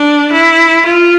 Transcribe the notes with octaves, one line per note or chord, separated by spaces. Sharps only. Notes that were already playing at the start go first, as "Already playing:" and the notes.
Already playing: D4
E4
F4